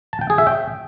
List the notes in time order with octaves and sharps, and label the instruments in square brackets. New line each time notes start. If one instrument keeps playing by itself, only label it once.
[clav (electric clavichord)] A5
G5
G#4
E5
G5